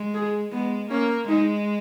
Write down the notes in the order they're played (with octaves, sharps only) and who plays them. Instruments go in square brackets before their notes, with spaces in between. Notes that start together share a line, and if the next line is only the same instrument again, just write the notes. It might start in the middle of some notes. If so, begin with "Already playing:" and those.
Already playing: [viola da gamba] G#3
[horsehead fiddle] G#4
[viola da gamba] G#3 [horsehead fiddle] B3
[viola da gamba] A#3 [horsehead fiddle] C#4
[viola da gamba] G#3 [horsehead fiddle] D#4